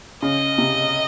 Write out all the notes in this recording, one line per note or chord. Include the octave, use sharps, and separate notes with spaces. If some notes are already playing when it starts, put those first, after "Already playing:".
C#3 D#5
C3